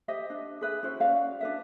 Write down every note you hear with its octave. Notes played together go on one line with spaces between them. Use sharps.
G4 C5 D#5 E5
D4
G#4 B4 E5
C#4 E4 F#4 C5
C#4 F#4 D5 F5
D4 B4 E5